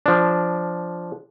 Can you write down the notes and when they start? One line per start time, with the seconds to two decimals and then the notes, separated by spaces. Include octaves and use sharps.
0.06 F3 D4